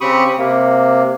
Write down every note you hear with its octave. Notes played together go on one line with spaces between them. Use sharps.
C#3 C4 G4 B5 C#6 D#6
C3 A#3